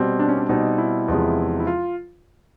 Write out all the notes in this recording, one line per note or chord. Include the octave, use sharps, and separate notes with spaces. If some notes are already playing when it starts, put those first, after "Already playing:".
Already playing: B2 G3 C4
D4
C#4
D4
B2 G3 C4 D#4
E4
E2 C3 F3 G#3
E4
F4